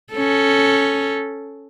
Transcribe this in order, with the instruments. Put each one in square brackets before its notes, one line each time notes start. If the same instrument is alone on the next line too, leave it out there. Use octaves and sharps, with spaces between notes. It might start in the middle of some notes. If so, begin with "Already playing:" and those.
[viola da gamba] C#4 A4